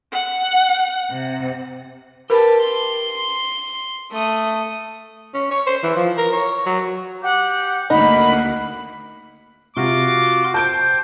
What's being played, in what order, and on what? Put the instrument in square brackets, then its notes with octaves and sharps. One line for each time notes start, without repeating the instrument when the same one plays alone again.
[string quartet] F#5
C3
[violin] G4 A5 [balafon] A#4 B4 B5
[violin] C6
A3 D#6
[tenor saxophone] C#4
C#5
C5
E3
F3
A#4
C#5
F#3
[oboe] G4 [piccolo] F#5
[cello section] D2 A#3 [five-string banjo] D#4 [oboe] F#5 [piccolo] B5
[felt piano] C3 [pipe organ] F4 F#4 C6 [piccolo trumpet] D6
[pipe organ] C5 G5 [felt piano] A5 G6 D7